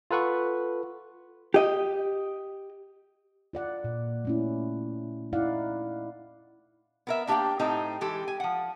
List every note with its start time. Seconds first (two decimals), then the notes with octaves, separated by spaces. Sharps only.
0.11 F4 A4 B4 F#5 C#6
1.54 G4 D#5
3.53 F4 D5 F#5
3.84 A#2
4.25 A3 C#4 E4
5.33 D#4 E4 D5 F5 F#5
7.07 B3 A#4 E5
7.27 A#3 D4 G4 E5 F5 G5
7.59 A2 C4 D#4 G4 A4 A#5
8.01 E3 G#3 G4 A4
8.28 G#5
8.40 F3 F#5